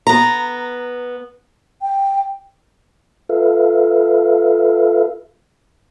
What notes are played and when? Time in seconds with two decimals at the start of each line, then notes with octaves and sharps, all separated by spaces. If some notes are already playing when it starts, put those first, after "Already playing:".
0.07 B3 A#5
1.82 G5
3.29 F4 A4 B4 E5 F5